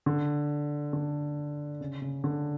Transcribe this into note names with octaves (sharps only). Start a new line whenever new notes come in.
D3
D3
C#3
C#3
D3